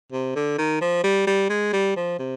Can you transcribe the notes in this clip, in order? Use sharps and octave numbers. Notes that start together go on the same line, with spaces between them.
C3
D3
D#3
F3
G3
G3
G#3
G3
F3
C3